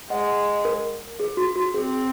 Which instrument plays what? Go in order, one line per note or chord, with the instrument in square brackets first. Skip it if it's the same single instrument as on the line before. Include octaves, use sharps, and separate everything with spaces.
[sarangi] G#3 [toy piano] D#5 F#5
[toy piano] A#4
G#4
F#4
F#4
[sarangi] C4 [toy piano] G#4